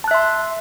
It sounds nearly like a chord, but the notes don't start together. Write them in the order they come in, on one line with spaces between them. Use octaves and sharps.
A5 F#6 E5 C6